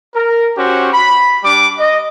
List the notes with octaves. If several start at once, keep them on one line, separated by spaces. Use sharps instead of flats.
A#4
C#4 F#4 G4 C5
B5
G3 D4 D6
D#5